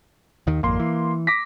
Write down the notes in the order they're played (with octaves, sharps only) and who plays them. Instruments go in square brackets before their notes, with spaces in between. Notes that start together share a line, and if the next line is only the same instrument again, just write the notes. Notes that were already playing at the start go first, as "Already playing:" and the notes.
[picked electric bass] D#2 D#3
[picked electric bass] G#1 F2 [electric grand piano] A#3 C6
[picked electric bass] E3
[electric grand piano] D6 A#6 B6